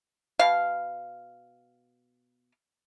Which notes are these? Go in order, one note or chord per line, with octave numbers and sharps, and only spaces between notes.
B2 F5